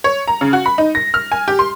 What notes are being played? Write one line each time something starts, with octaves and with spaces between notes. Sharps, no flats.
C#5
A#5
C#3
F#4
B5
D#4
A#6
F6
G#5
G4
C6